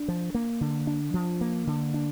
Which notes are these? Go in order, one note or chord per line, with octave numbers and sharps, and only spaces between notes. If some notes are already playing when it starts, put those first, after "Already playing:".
Already playing: D4
F3
A#3
D3
D4
F3
A#3
D3
D4